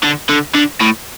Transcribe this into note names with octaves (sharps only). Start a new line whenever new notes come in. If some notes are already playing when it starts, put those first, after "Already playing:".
D3
D3
D3
A2